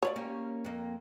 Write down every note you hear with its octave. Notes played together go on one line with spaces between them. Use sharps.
F4 B4 C#5 D5
A#3 C#4 G4
F2 A#3